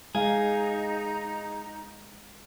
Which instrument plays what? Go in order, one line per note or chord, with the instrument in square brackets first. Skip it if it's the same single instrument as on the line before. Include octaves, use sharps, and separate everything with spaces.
[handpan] G#3 F5 [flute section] D#4 A#5 [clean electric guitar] G#4